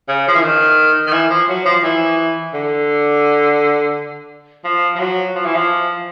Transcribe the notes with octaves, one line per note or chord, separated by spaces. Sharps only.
C#3
F3
E3
D#3
D#3
E3
F3
F#3
F3
E3
D3
F3
F3
F#3
F3
E3
F3